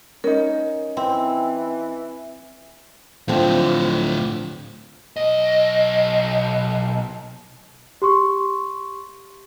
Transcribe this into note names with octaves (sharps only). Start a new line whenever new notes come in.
C#4 D#4 A#4
E3 C4
A2 D3 F3 C4
B1 D#5
G4 C6 C#6